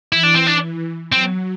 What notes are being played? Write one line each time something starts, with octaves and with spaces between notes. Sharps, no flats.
E3 E4
D4
C4
D4
F#3 C4